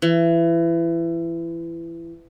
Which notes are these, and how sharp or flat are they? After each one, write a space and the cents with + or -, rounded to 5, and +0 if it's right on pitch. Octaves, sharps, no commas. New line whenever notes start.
E3 +25